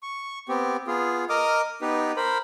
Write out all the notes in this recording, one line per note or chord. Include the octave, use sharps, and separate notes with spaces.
C#6
B3 C4 G4
B3 F4 G#4
A#4 D#5 D6 D#6 F6
B3 D#4 G4 B4
A#4 C5 B5